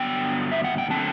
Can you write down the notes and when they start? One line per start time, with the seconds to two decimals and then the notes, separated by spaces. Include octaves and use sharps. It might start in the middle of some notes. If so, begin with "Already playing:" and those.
Already playing: G2 D3 F#3 B3 D4 G5
0.52 E5
0.64 F#5
0.78 G5
0.90 D3 F#3 A3 C4 A5